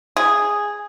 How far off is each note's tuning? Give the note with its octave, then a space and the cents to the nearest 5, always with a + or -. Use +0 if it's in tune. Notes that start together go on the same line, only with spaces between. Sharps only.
G#4 -5